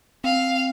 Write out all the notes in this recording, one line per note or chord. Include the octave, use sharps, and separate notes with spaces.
C4 F5